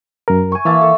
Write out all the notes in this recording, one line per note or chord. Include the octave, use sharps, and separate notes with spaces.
F#2 A#4
G#5 C#6
E3 A#3 E5 A5
A4